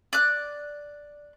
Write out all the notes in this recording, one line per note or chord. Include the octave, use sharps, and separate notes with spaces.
D5 F#6